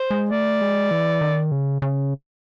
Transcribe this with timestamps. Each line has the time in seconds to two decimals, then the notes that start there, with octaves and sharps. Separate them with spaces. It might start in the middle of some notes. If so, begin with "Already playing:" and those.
Already playing: C5
0.11 G#3
0.31 A3 D5
0.61 G#3
0.91 E3
1.21 D#3
1.51 C#3
1.82 C#3